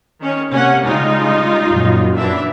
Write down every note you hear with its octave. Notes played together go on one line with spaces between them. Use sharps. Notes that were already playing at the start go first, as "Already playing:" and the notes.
D#3 C#4
C3 A#3 C#4 F#5
C#3 G3 G#3 D#4 F4
F#2 A#2
E3 D4 E5